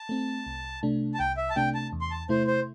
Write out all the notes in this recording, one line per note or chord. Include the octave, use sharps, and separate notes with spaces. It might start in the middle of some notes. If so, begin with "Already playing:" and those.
Already playing: A5
A3 C4
C2
C3 A3 D4
A5
C2 G5
E5
A5
C3 A3 D4 G5
A5
E2
C6
A5
C3 A3 E4 C5
C5